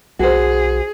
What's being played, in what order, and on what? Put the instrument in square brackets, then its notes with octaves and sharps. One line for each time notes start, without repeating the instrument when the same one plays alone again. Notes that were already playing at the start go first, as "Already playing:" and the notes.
[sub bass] B1 [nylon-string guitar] F#4 C5 [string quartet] G#4